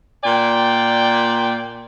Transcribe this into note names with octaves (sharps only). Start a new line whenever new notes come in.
A#2 D5 G5